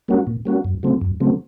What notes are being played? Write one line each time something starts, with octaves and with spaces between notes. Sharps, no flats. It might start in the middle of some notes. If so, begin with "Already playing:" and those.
G3 A#3 C#4 F#4
A#2
G3 A#3 C#4 F#4
F#2
C#3 F#3 A3 C4
F#2
C#3 F#3 A3 C4